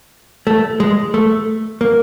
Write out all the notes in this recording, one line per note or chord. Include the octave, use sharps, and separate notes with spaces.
A3
G#3
A3
A#3